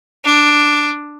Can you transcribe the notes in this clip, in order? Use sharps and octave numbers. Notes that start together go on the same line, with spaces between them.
D4